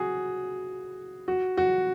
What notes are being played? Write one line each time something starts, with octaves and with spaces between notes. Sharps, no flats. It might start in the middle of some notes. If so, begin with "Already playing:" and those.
Already playing: F#4 G#4
F#4
F#4